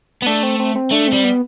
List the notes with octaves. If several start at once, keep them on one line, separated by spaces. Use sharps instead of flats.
B3
A3 D4
C4
C4
C4
A3 D4
C4
G3
B3